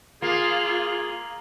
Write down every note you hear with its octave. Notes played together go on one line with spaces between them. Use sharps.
A#3 F4 G#4